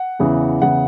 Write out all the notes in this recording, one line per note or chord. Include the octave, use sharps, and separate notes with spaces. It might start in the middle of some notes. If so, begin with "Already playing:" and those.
Already playing: F#5
E2 C#3 E3
E2 C#3 E3 F#5